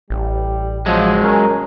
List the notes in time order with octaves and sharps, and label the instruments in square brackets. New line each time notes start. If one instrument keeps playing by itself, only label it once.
[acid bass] A1 [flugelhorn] G3
[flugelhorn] F3 [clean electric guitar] F#3 G#3
[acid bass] C#4 [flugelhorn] A#4